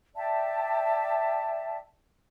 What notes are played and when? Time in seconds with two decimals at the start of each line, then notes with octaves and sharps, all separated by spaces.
0.16 D5 E5 G5 A5